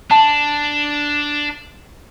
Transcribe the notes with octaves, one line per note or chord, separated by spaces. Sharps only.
D4 A5